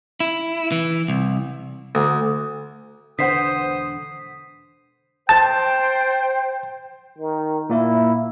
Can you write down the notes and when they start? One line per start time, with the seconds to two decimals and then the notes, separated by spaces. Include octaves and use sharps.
0.20 E4
0.72 E3
1.08 C2
1.95 D2
3.19 E1 D3 B3 C5 F#5 D#6 B6 C7
5.29 C5 G5 A5
7.18 D#3
7.69 A#2 A#3 E4 A#4